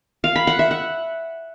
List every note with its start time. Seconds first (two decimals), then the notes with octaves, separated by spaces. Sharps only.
0.24 F5
0.36 B5
0.47 F#5
0.59 E5
0.71 F#5